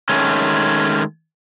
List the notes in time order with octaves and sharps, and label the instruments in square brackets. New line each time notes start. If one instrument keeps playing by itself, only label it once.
[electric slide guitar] D#3 G#3 A3 C#4